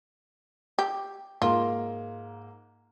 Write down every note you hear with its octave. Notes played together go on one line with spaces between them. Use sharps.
G4
G#2 A#3 F4